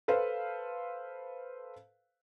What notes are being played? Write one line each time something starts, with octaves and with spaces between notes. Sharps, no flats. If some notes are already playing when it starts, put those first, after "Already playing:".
A4 B4 C5 F5